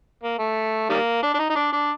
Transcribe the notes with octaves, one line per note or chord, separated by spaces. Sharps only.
A#3
A3
D#3 G3 A#3
D4
D4
D#4
D#4
D4
D4